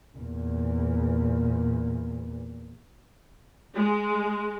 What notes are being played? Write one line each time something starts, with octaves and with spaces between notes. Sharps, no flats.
E2 A#2
G#3